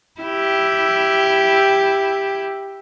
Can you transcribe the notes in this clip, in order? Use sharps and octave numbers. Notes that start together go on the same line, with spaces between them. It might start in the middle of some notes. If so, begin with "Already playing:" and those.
E4 G4